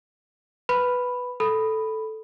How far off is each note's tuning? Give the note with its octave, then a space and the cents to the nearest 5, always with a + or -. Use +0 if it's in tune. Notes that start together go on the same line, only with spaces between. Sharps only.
B4 +0 B5 +0
A4 -5 B5 +0